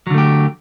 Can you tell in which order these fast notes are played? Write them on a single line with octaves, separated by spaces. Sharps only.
F#3 D3 A3 G4